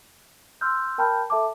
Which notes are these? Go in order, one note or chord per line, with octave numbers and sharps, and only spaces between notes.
C6 E6 F6 G6
A#4 G5 A5 B5 F6 G6
A4 E5 A5 D6